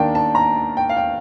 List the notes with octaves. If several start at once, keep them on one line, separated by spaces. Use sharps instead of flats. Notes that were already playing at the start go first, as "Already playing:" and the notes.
Already playing: D#2 D#3 A#3 D4 G5 A5
A5
A#5
G5
F5
G5